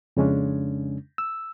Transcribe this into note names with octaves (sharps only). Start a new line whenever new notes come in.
F2 C#3 G#3 C#4 D4
E6